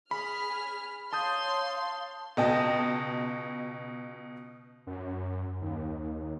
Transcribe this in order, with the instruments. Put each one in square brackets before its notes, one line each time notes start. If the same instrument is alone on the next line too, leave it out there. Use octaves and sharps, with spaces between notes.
[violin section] G#4 F6 [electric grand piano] B5
[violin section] C#5 F5 C6 [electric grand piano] A5 D#6 G6
[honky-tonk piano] C#2 B2 D#5 G5 A5
[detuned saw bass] F#2
D#2